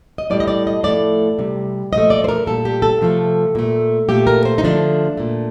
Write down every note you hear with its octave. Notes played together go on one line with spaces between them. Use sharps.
D#5
A2 G3 D5
D#5
D5
D#5
A2 F3 A3 D5
C3 G3
A#2 F3 A3 D#5
D5
C5
A#4
A#2 G3 A4
G4
A4
C3 F3 A3
A#2 A3
A#2 A3 G4
A#4
C5
D#4
D3 F3 A3 D4
A#2 A3